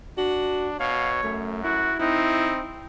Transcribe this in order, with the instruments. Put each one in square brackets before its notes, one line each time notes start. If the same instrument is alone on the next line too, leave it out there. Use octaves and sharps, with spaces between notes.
[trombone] D4 [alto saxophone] F#4
[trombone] B2 [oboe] C#5 [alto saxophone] F5
[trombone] F#2 [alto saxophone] A3
[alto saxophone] E4 [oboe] F#4
[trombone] C4 [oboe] D#4 [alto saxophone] E4